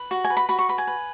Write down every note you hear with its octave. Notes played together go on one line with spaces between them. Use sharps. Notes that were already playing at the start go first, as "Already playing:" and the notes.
Already playing: B4
F#4
G#5
B4
B5
F#4 B5
C#6
B4 B5
G#5
B4